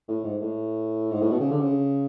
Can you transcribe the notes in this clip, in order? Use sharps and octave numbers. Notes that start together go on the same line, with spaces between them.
A2
G#2
A2
G#2
A2
B2
C#3
D3
C#3